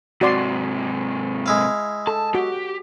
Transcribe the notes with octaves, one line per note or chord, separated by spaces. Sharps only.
G#2 C3 F#4 D5 C6
G#3 E4 F5
A4 A5
F#4 G4